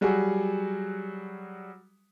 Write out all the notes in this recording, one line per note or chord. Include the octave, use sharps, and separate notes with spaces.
F#3 G3 F#4 G#4